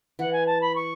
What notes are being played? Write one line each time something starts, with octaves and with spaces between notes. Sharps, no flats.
E3 F#5
G#5
A5
B5
C#6